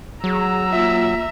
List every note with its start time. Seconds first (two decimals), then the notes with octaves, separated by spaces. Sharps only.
0.24 F#3 G#4 A#5 E6
0.71 A#3 F4 E5